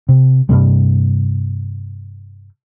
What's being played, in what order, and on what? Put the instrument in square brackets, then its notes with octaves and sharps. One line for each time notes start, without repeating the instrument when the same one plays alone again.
[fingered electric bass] C3
G2 C3 G3